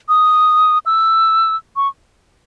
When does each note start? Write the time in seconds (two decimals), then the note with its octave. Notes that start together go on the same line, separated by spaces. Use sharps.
0.09 D#6
0.86 E6
1.76 C#6